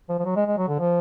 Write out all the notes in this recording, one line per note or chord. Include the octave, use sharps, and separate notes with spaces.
F3
F3
F#3
G#3
G#3
F#3
D3
F3